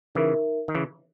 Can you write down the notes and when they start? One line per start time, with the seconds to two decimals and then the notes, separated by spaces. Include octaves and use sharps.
0.15 C#3 E3 D#4 A#4 E5
0.68 D#3
0.75 C#3 E3